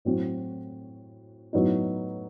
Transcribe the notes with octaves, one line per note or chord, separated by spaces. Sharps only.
A2 F#3 C4 F#4
A2 F#3 B3 D#4